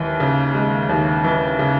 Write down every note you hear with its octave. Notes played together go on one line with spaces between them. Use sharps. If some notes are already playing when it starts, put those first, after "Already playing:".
Already playing: D#2 E3
C#3
G#3
D#2
E3
C#3